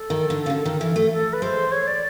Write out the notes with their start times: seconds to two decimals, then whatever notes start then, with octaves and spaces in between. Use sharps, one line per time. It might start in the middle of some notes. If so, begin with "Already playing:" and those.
Already playing: A4
0.10 D#3
0.30 D3
0.46 C#3
0.50 D3
0.65 D#3
0.81 E3
0.96 A3
1.11 A4
1.33 B4
1.42 G#3 C5
1.72 C#5
1.87 D5